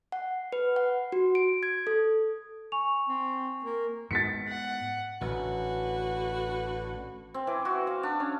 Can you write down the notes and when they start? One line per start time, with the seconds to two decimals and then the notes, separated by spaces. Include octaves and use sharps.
0.12 F#5
0.52 B4
0.76 F#5
1.12 F#4
1.35 D7
1.63 G#6
1.87 A4
2.72 G#5 C#6 F7
3.08 C4
3.64 A#3
4.11 G#2 G#3 B3 A6 B6 C#7
4.48 F#5
5.21 A1 D3 F#4 B4
7.34 C4
7.47 E3
7.65 F#4
7.87 F5
8.03 D4
8.20 C#4